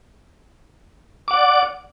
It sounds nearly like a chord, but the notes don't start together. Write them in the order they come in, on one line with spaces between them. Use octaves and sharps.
D6 F#5 D5